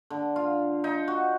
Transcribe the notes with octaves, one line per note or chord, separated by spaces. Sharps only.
D3
F4
D#4
F#4